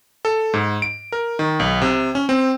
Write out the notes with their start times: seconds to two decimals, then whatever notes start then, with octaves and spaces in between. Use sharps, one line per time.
0.25 A4
0.54 G#2
0.82 D7
1.12 A#4
1.39 D#3
1.60 B1
1.82 C3
2.15 C#4
2.29 C4